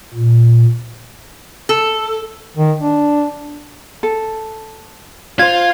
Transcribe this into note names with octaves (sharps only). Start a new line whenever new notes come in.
A#2
A4
D#3
D4
A4
F4 C5 F5 G#6